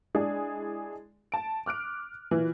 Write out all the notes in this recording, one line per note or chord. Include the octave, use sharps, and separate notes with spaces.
G#3 D4 E4 G#4
A5 D7
D6 F6 F#6 D7
A#2 E3